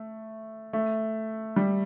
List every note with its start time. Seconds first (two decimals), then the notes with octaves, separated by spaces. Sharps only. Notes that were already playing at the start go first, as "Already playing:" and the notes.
Already playing: A3
0.73 A3
1.56 G3